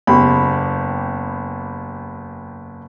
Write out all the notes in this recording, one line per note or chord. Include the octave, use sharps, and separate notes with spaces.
F#1 E2 G4 B5